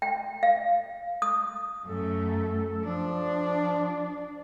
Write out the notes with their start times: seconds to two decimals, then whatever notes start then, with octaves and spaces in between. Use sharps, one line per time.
0.02 G5
0.43 F5
1.22 D#6
1.86 F#2 A3 A4
2.85 F3 D4